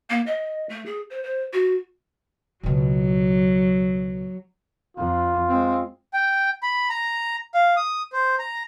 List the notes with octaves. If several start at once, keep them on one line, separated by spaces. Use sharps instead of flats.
A#3
D#5
A3
G#4
C5
C5
F#4
C#2 B2 F#3
F2 F4
G#3 C4
G5
B5
A#5
F5
D#6
C5
A#5